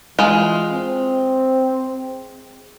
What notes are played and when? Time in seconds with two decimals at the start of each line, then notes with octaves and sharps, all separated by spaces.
0.19 E3 G#3 F4
0.71 C4